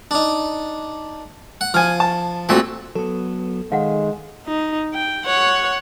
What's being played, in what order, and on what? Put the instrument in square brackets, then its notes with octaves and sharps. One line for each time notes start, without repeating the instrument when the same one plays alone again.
[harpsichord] D4 D#4
F#5
[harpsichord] F3 [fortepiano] G#5 F6
[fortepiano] A5
[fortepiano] A#2 A3 F#4 [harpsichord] C4 C6
[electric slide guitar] F#3 B3 [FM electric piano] A4
[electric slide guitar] D#3 [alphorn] G#3 [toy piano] F5 F#5
[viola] D#4
G5
C#5 F#5